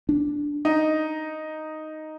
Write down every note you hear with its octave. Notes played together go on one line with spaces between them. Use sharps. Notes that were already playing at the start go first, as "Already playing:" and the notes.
D4
D#4